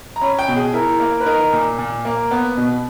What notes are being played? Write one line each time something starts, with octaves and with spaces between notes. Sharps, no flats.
A#5
C#4 B5
G5
B2
G#4
E4 A#4
A#3
B4
D#4 A#4
A#2
A#2
A#3
B3
B2